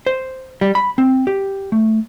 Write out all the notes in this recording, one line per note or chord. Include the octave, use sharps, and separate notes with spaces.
C5
G3
B5
C4
G4
A3